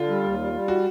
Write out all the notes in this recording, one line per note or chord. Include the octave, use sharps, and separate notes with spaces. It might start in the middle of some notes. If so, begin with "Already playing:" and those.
Already playing: D3 F4
G3
D#2
G3
G3
E3 F#4